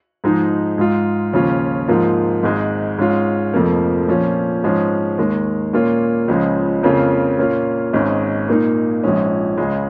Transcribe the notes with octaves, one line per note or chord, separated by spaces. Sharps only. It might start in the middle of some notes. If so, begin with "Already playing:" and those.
G#2 F3 G#3 D#4
G#2 G#3 F4
D#2 C#3 F3 C#4 F4
G#2 F3 A#3 F4
G#1 G#2 G#3
G#2 G#3 C#4 F4
F1 F2 F3 A#3
A#2 F3 C#4 F4
G#2 F3 G#3 C#4
D#2 D#3 G#3
A#2 A#3 C#4 F4
C#2 C#3 F3 G#3
F2 C#3 A#3 F4
A#2 A#3 C#4 F4
G#1 G#2 G#3 C#4
A#2 A#3 D#4
A#1 G#2 F3 G#3 C#4
C#2 C#3 G#3